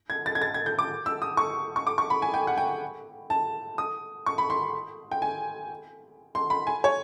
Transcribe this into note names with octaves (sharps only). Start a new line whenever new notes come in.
G#6
A6
G#6
A6
G#6
G6
D6
E6
D#6
C#6
C#6
D6
C#6
B5
G#5
G5
F#5
G5
A5
D#6
C#6
B5
C6
G5
G#5
C6
B5
G#5
C#5